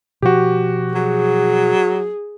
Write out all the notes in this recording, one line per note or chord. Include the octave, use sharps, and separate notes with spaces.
B2 F3 F#4 G4
F#3 G#4